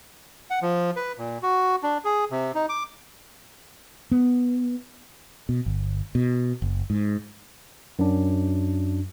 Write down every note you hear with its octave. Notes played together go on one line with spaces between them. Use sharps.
F#5
F3
B4
A#2
F#4
D4
G#4
C3
D#4
D6
B3
B2
G1
B2
F#1
G#2
F#2 D4